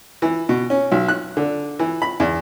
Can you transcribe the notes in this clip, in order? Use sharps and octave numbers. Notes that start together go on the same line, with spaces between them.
E3
B2
C#4
B1
F#6
D3
E3
B5
E2